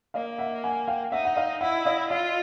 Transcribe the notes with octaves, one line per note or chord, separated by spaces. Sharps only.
A#3 D#5 F5
E5 F#5
F#5 G#5
F5 G5
D#4 E5 F#5
F#5
D#5 F5
E4 E5 F#5
D#5 F5
F4 D#5 F5